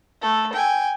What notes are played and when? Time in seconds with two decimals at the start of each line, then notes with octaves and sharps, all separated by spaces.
0.22 A3 A4
0.53 G5 G#5